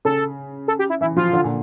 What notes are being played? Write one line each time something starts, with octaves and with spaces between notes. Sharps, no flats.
C#3 A4
A4
G4
E4
E3 E4
F3 F4
D3
A#2